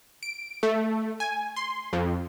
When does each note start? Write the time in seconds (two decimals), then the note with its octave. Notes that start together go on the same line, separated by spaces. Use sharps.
0.23 D7
0.63 A3
1.20 G#5
1.56 C6
1.93 F2